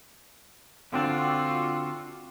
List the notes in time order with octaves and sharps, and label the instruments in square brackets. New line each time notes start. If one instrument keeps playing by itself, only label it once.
[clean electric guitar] D3 C4 D4 [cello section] F4 F#4